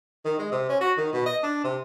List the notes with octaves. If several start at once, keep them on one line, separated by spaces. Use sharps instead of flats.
D#3
G#3
C3
C#4
F#4
D#3
B2
D#5
D4
C3